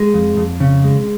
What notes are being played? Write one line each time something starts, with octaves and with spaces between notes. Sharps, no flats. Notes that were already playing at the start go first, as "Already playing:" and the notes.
Already playing: G#3
F2
F2
C#3
G#3